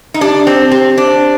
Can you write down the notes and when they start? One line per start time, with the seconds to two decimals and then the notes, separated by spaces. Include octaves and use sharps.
0.14 D#4
0.21 D4 G4
0.47 C4 G4
0.71 C4 G4
0.98 D4 C5